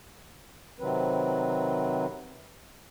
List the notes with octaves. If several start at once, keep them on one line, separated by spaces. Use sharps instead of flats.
C3 D#3 F#3 C4 B4